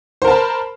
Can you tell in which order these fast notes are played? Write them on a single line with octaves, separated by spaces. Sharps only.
C5 A#4 A5 B5